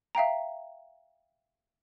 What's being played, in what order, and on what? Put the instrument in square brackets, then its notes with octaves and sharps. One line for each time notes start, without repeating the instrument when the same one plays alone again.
[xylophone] E5 F5 G5 A#5